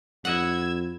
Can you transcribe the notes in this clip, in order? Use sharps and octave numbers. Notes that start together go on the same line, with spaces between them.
F2 E4 D#5 F#5 E6 G#6